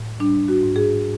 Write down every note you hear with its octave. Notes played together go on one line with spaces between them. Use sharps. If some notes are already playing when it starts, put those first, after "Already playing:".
Already playing: A2
G3 D4
F#4
G#2
G#4